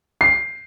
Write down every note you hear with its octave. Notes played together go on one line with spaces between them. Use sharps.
C7